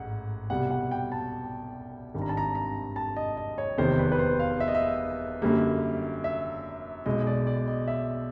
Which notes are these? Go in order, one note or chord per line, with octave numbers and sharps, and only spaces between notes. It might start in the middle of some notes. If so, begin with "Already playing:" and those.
Already playing: A1 G#2 F#5
C2 B2 G3 F#5
F#5
G5
A5
G#1 G2 D#3
A#5
A5
A#5
A#5
A5
D#5
D#5
C#5
F1 E2 C3 D#3 C5
B4
B4
C5
F5
E5
D#5
E5
F#2 D3 G3 A#3
E5
B1 B2 G#3 D#5
D5
D5
D#5
E5